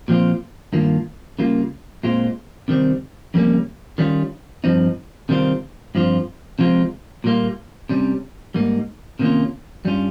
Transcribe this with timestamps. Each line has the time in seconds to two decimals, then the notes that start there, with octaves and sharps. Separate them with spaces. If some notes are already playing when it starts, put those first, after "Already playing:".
0.08 A#2 F3 C4 F4
0.73 G2 D#3 A#3 F4
1.39 C#3 G3 A#3 F4
2.03 A#2 G#3 C4 F4
2.68 C3 D#3 G3 C4
3.34 F2 C#3 G3 A#3 C#4
3.98 D#3 G3 C#4 F4
4.64 G2 F3 C4 D#4
5.29 C3 D#3 G3 C4 F4
5.95 G2 F3 C4 F4
6.59 C3 F3 G#3 C4 F4
7.24 A#2 G3 A#3 F4
7.89 C3 G3 C#4
8.54 G#2 G3 A#3 D#4
9.19 C3 D#3 A#3 C#4 F4
9.85 G2 G3 C#4 F4